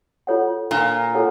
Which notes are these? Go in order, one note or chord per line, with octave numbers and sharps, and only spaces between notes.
F4 A4 C#5 F#5
A#2 D4
F4 A4 C#5 F#5